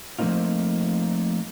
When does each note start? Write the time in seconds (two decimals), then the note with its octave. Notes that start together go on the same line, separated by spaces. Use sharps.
0.19 F3 A3 A#3 C4 D#4 F4